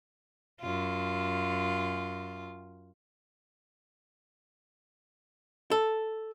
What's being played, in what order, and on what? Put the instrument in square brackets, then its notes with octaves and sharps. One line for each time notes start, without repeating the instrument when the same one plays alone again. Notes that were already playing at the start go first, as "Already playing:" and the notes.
[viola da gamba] F#2 F4
[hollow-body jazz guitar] A4